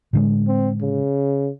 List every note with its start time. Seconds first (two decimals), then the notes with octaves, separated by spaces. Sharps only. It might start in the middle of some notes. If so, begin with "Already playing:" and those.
0.13 A2 D3 G#3
0.48 C4
0.82 C#3